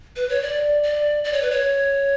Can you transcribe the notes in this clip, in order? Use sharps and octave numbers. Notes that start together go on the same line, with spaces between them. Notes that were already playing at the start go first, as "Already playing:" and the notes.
B4
C#5
D5
D5
D5
C#5
B4
C#5